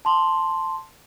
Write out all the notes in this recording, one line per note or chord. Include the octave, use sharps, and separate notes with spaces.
A5 C6